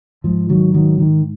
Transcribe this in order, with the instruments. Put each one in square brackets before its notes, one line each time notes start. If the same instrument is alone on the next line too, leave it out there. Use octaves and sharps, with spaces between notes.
[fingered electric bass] G#2 F3
D#3 F#3
D#3 F#3
D#3